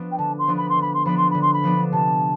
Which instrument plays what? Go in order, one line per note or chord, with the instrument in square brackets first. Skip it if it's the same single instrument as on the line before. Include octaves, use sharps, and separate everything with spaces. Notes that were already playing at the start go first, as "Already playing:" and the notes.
Already playing: [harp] F3 B3 D4
[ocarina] G5
[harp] D3 [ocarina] A5
[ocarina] C6
[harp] F3 B3 D4
[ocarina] B5
C6
[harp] D3 [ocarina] B5
[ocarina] C6
[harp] F3 B3 D4 [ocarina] B5
[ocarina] C6
[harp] D3 [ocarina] B5
[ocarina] C6
B5
[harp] F3 B3 D4
[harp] C3 [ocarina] A5